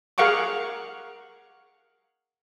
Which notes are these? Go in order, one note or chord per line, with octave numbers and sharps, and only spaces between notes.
G#4 A#4 F5 F#5 C#6 D6